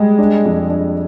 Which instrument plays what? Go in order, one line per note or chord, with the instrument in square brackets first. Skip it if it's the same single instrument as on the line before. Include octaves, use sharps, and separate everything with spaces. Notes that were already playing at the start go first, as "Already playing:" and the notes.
Already playing: [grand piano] G3 [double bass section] G#3
[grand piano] D4
F2
D4